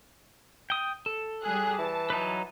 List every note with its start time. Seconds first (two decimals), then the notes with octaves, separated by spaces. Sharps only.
0.70 G5 D#6
1.06 A4
1.42 G3 G#4 F#6
1.78 E3 A5
2.10 F#3 D#4 B4